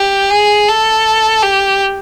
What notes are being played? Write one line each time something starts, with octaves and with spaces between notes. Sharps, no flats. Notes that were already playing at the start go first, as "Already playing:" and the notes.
Already playing: G4
G#4
A4
G4